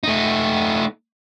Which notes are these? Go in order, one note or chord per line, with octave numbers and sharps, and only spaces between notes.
A3 D#4